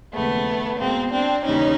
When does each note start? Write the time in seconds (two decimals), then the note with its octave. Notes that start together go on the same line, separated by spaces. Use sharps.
0.12 D#2 C#3 F3 G#3 A3 B3
0.78 E2 B2 G#3 A#3 C4
1.11 C4 D4
1.44 D#2 C#3 E3 G3 C#4 D#4